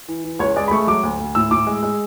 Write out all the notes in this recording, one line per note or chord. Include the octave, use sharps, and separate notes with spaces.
E3
E3
C#2 C#5
G#3 D5
B5
A3 C#6
F#3 D6
D2
D2
A2 E6
A2 D6
G#3
G#3